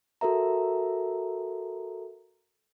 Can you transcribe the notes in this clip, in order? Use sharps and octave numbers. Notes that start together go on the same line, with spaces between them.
F#4 A4 A#4 E5 A#5